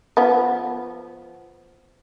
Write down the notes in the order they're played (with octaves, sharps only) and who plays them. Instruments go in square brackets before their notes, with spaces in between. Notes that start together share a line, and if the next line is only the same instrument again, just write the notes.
[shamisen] F3 B3